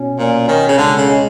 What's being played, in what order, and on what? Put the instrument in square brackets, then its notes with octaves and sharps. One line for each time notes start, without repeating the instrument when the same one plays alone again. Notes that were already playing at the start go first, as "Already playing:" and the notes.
Already playing: [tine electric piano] B2 C#4
[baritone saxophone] A#2 [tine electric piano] C#4
[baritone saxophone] D#3 [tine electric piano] C#4
[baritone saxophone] C#3
[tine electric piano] C#2 [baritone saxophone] D3
[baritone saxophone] C#3
[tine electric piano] G#3